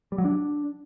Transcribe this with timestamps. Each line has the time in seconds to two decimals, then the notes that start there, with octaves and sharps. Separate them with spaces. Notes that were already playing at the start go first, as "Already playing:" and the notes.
0.12 G3
0.18 F#3
0.25 D4